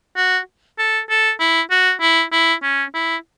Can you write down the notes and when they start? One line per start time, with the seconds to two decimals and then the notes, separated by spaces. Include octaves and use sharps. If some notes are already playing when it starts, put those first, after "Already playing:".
0.17 F#4
0.79 A4
1.10 A4
1.40 E4
1.71 F#4
2.01 E4
2.32 E4
2.63 C#4
2.95 E4